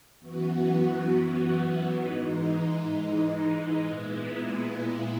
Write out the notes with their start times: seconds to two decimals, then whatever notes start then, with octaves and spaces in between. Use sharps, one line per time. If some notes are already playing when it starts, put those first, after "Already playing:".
0.19 F#2 E3 B3 F#4
2.00 G#2 E3 G#3 D#4
3.82 A#2 G#3 B3 E4